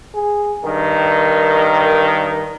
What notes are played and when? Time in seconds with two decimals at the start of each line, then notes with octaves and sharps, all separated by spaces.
0.15 G#4
0.65 G2 D#3 A#4